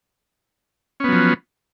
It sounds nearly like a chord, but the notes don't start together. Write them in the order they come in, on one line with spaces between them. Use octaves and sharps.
C#4 B3 F#3 F3